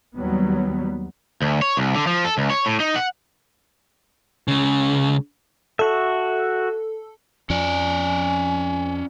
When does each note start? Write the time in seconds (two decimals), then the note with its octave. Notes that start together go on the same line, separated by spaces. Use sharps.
0.16 D#2 F#3 G3 B3
1.42 D2
1.62 C#5
1.77 C2
1.95 D3
2.07 F3
2.25 A4
2.38 C#2
2.50 C#5
2.66 A2
2.80 D#4
2.96 F#5
4.48 C#2 C#3
5.79 F#4 A4 E5
7.50 F2 F3 C#4 D5 G#5